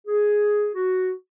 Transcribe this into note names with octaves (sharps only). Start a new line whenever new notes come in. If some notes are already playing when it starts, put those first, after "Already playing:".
G#4
F#4